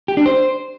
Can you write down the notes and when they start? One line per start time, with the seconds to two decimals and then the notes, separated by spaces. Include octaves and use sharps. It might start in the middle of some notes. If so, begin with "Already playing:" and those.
0.08 G4
0.17 D4
0.26 C5